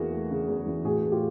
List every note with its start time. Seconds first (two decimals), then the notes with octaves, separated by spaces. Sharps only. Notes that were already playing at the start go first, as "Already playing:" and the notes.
Already playing: E2 E3 A#3 F#4 G#4
0.12 A3
0.31 C#3
0.48 E2
0.67 E3
0.84 A2 F#4 G#4
1.03 A3
1.11 F4 G4